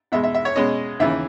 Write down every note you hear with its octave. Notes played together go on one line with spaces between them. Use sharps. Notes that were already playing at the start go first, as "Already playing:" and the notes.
E2 B2 G#3 E5
E5
E5
C#5
B2 G#3 C#4 D#5
D#2 C#3 E3 E5